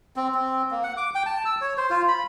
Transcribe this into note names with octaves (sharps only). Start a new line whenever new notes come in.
C4
C4
A#3
F#5
D6
G5
A5
E6
C#5
C5
F4
B5